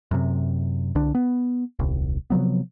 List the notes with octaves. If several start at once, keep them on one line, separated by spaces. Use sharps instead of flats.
F#2 C3
C2 D3 D4
B3
D#1 C2
C3 F3 F#3 B3